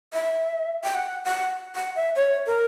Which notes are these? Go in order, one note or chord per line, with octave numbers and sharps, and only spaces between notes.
E5
G5
F#5
F#5
F#5
E5
C#5
A#4